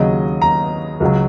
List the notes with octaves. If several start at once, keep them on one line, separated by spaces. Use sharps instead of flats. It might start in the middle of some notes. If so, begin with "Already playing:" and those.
Already playing: D#2 C#3 F#3 D#5
A#5
C#2 C#3 F#3